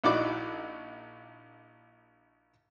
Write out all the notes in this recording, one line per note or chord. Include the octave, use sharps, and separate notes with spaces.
A#1 D#4 E4 F#4 D5 D6